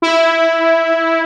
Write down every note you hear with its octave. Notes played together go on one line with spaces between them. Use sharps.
E4